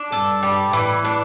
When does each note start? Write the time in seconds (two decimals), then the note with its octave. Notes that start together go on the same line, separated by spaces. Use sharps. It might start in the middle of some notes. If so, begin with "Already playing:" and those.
Already playing: D4
0.12 G2 A4
0.43 G3
0.73 A2 E3
1.04 D4